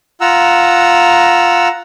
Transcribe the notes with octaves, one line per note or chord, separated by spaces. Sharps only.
F4 F#5 A#5 E6